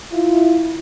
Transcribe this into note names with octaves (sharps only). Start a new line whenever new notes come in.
E4 F4